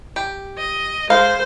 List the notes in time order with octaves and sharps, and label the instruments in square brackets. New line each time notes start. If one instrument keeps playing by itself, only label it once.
[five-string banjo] G4
[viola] D#5
[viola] G#3 [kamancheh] C5 [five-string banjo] F5